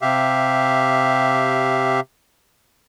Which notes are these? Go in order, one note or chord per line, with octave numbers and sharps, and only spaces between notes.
C3 G4 E5 F5